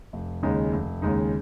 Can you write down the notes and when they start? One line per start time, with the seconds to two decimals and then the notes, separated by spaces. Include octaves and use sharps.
0.13 F1
0.43 D#2 C#3 G#3 D#4
0.73 F1
1.02 D#2 C#3 G#3 D#4